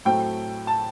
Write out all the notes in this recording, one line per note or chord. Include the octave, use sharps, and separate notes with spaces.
A2 F#3 A3 C4 G5
A5